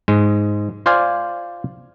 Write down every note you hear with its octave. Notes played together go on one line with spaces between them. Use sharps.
G#2 G#3
F4 C5 D5 F5 G#5